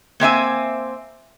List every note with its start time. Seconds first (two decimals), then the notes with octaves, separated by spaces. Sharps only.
0.20 A#3 C4 E5 G#5